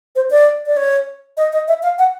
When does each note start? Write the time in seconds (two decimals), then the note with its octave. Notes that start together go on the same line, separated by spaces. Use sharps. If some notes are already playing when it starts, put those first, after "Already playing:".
0.15 C5
0.30 D5
0.66 D5
0.77 C#5
1.37 D#5
1.52 D#5
1.68 E5
1.83 F5
1.98 F#5